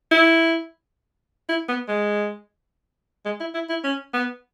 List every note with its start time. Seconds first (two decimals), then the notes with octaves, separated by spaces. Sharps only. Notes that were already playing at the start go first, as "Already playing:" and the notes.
0.11 E4
1.49 E4
1.68 B3
1.88 G#3
3.25 G#3
3.40 E4
3.54 E4
3.69 E4
3.84 C#4
4.14 B3